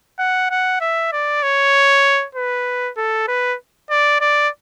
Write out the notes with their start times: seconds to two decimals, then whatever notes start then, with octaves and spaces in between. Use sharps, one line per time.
0.19 F#5
0.51 F#5
0.81 E5
1.12 D5
1.43 C#5
2.35 B4
2.97 A4
3.28 B4
3.90 D5
4.21 D5